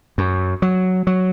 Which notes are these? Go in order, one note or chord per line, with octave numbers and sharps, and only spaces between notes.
F#2
F#3
F#3